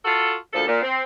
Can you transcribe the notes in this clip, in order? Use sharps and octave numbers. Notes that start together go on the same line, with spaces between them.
F4 F#4 A4
D2 A#2 F3 A4
A#2
C4